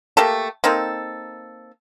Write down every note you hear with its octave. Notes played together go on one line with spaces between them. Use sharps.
A3 A#3 G4 A4
A#3 C4 D#4 A4